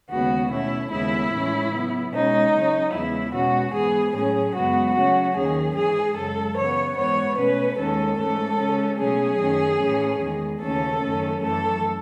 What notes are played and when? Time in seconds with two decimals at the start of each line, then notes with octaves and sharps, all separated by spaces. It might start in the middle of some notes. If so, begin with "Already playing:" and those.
0.10 D#2 C#3 G#3 B3 F#4
0.50 B2 A3 C#4 E4
0.91 D#2 C#3 G#3 B3 E4
1.31 A2 E3 G#3 C#4
1.72 C#3 F#3 B3
2.13 B2 G#3 C#4 D#4
2.53 C#3 F#3 C#4
2.93 E2 C#3 G#3 B3 E4
3.33 B2 G#3 C#4 F#4
3.74 G#2 E3 B3 G#4
4.14 A2 F#3 C#4 G#4
4.55 F#2 C#3 G#3 B3 F#4
4.95 C#3 F#3 A3 C#4 F#4
5.36 D#2 D#3 F#3 C#4 G#4
5.76 G#2 E3 G#3 G#4
6.16 F#2 C#3 G#3 A4
6.57 C#3 E3 B3 C#5
6.97 G#2 E3 B3 C#5
7.38 B2 A3 C#4 B4
7.78 D#2 D#3 G#3 C#4 A4
8.18 G#2 E3 A3 C#4 A4
8.59 C#3 G#3 C#4
8.98 B2 F#3 A3 C#4 G#4
9.39 F#2 D#3 A3 C#4
9.80 A2 E3 A3 C#4
10.20 E2 D#3 G#3
10.60 D#2 C#3 E3 A3 C#4 A4
11.01 F#2 D#3 A3 C#4
11.42 F#2 E3 A3 A4